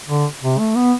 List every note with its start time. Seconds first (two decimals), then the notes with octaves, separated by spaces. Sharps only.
0.08 D3
0.42 C3
0.59 A3
0.76 B3